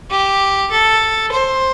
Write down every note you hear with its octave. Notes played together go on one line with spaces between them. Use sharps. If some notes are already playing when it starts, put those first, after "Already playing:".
G4
A4
C5